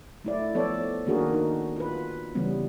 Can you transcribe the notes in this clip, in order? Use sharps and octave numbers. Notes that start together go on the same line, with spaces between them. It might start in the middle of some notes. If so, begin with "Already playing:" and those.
A3 E4 D5
F3 B3 A4 C#5 D5
D#3 A#3 D4 F#4 G#4 A#4
D#4
F4 B4
C#3 E3 G3 B3 C#4